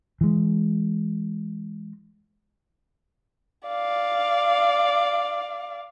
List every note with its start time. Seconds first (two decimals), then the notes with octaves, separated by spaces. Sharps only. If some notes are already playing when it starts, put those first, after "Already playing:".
0.21 E3 G#3
3.68 D5 F5